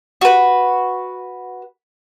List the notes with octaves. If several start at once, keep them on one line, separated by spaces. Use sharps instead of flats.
F#4 B4